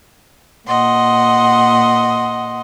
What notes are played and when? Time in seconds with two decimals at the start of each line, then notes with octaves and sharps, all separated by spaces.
0.67 A#2 D#5 F#5 C6